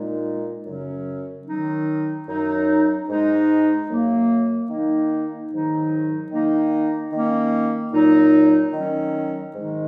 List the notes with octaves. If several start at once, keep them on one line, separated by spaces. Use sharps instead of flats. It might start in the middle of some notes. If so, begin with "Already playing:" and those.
Already playing: A#2 G#3 D#4
F#2 C#3 F#3 C#4
D#3 F#3 D#4
F#2 F#3 D#4
G#2 G#3 D#4
F#2 F#3 A#3
D#3 A#3 D#4
G#2 D#3 F#3 D#4
D#3 A#3 D#4
D#3 A#3 C#4
A#2 F#3 D#4
D#3 F#3 C#4
G#2 D#3 G#3 D#4